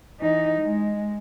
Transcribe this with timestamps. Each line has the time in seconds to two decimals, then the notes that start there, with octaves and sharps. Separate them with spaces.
0.20 E3 D#4
0.61 G#3